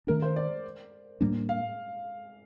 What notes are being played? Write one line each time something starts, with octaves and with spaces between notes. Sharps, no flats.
D#3 A3 D4 A#4
C5
D5
A2 G3 A#3 D4
F5